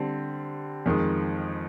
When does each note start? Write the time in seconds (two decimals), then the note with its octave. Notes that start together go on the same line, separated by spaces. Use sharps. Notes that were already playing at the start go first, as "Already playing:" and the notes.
Already playing: D3 G3 C4
0.86 F2 D#3 G#3